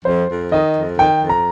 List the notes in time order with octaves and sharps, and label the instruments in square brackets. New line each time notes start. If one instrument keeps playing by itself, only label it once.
[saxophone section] F2 [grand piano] C5
[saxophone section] F2
[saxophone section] D#3 [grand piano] D#5
[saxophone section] F2
[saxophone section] D#3 [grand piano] G5
[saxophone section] F2
[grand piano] A#5